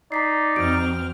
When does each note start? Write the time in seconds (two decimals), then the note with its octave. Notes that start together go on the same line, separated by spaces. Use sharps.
0.12 D#4 D5 A#5 B6 C7
0.56 F2 C4 F#4 F6 G6 D7